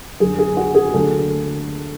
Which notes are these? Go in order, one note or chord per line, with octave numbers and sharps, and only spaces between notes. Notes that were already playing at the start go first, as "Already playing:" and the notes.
F#2 D3 F#3 G#4
G#4
F#4
G#4
D2 D3 F#3 A#3 A4